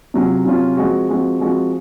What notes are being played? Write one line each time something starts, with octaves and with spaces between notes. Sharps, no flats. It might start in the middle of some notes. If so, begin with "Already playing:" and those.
C3 F#3 C#4 F4
C3 F#3 C#4 F4
F3 G#3 C4 F#4
F3 G#3 C4 F#4
F3 G#3 C4 F#4